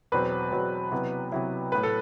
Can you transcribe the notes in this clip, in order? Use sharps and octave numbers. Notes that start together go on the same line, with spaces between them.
E2 B2 F#3 C4 B4
E2 B2 F#3 C4
C3 F#3 B3 E4
C3 F#3 B3 E4
A2 F#3 B3 B4
A4